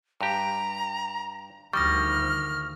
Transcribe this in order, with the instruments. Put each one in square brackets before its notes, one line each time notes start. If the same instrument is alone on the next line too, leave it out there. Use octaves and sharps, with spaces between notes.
[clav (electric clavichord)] G2 G4 [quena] A#5
[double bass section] D2 D#3 F3 [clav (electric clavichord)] G3 [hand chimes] C#6 D#6 A#6 [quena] F6